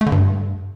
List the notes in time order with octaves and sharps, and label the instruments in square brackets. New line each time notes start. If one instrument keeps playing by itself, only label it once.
[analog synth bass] A3
D3
G2